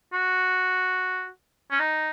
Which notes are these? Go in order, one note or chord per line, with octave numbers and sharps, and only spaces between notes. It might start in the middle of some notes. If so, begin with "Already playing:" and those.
F#4
C#4
D#4